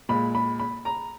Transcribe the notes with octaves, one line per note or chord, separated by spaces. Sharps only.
A#2 G#3 B5
B5
B5
A#5